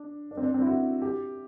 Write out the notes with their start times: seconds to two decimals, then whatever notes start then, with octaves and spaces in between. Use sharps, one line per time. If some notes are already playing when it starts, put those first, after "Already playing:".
Already playing: D4
0.31 D4
0.37 C4
0.43 D4
0.54 C4
0.62 E4
0.66 F#4
1.02 G4